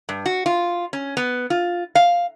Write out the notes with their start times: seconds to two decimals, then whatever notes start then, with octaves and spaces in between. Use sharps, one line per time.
0.09 G2
0.26 F#4
0.46 F4
0.93 C#4
1.17 B3
1.50 F4
1.95 F5